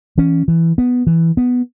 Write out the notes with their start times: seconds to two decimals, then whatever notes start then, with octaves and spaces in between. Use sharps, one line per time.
0.18 E3 C#4
0.48 E3
0.78 B3
1.07 E3
1.37 B3